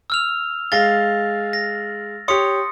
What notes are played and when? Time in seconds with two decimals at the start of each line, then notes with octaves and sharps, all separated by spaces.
0.10 E6 F6 F7
0.72 G#3 F5 A6 A#6 G7
1.53 A#6
2.28 G4 C#5 C6 D#6 C#7